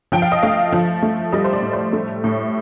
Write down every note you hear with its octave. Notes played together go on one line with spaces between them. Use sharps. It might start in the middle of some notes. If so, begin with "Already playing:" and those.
F3 G5
F5
D#5
A3 F5
F3
A3
G3 D#5
C5
D5
A2
C5
A3
A2